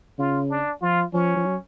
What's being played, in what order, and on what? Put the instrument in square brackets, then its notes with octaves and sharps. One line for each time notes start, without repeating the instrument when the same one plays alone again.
[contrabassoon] C#3 [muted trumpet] F4
[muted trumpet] D4
[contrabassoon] F3 [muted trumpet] F4
[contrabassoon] F3 [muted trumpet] C#4
[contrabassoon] F3
F#3